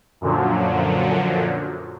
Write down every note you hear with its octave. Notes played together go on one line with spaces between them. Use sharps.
F#2 A#2 D3 F3 F#3